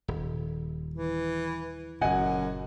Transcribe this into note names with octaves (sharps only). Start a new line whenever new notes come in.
D#1
E3
F#1 F#2 A#2 D#5 F#5 G#5